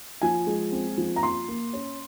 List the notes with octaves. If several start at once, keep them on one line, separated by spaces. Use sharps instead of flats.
F3 G#5
G#3
C4
F3
A#5
F3 C6
A#3
C#4